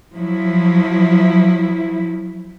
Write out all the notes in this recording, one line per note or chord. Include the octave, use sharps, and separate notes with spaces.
F3 F#3 E4